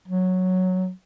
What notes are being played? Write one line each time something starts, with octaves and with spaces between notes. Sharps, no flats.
F#3